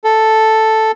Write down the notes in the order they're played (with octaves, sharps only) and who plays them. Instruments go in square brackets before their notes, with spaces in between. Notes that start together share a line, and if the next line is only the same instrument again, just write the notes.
[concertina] A4